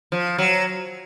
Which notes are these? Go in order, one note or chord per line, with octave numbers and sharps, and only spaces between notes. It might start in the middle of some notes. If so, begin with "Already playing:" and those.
F3
F#3